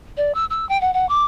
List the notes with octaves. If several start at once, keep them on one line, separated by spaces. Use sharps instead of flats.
D5
E6
E6
G5
F#5
F#5
D6